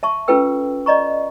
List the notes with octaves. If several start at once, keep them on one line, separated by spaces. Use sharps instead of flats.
E5 A5 C#6
C#4 F4 A4 B4 G5 E6
D5 D#5 A#5 C#6